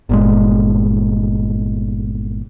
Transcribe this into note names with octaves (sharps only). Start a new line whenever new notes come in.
G1 A#2 G#3